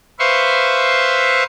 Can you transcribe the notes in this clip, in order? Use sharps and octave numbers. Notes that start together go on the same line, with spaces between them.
B4 C5 E5 F5 C6 C#6